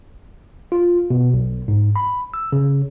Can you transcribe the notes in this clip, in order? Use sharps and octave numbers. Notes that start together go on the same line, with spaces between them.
F4
B2
B1
G#2
B5
E6
C#3